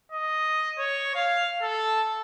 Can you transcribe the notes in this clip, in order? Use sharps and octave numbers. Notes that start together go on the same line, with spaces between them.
D#5
C#5
F5
A4